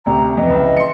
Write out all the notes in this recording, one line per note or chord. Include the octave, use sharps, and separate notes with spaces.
D2 C3 A#5
F2 E3 D#5
C#2 E5
D#5
C6 C#7